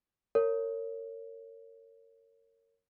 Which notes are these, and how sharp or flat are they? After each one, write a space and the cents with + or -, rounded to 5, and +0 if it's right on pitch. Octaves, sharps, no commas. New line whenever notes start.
A#4 -35 C#5 +0